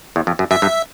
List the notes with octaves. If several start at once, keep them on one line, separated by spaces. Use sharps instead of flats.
E2
F2
F#2
F#2 E5
G2